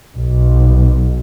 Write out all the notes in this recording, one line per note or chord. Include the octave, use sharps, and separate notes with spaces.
B1